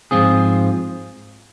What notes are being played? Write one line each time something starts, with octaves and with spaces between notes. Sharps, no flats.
G#2 F3 C4 F4 G#4